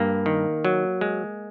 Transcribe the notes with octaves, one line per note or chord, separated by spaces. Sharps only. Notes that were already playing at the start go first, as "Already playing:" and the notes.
Already playing: G2 A#3
D#3
F#3
G#3